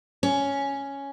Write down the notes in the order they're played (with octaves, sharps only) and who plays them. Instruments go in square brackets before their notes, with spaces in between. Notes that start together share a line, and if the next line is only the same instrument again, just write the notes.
[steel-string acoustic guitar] C#4